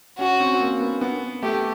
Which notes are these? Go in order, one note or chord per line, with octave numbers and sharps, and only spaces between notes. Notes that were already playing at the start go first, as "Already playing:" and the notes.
C#4 F#4
C4
A#3
B3
B3
A3 G4